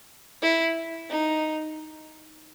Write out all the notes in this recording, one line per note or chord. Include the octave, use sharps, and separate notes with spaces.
E4
D#4